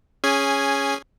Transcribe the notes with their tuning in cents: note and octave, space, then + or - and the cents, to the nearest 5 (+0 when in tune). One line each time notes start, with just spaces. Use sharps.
C#4 +0 G#4 +0 G#5 -10